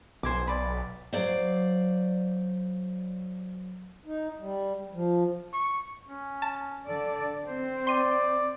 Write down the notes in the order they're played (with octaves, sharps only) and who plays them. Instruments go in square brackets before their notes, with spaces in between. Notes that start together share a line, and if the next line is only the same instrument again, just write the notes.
[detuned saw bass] B1 [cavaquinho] C5 G#5 D6
[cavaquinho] D5 B5
[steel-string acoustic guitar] F#3 C5 D5 F5
[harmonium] D#4
G3
F3
[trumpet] C#6
[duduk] C#4
[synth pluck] A5
[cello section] D3 D5 [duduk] A4
[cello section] C4 [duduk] C5
[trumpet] D5 [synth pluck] C6 D#7